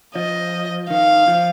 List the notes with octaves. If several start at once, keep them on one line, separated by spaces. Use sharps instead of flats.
F3 D#5
D#3 F5
F3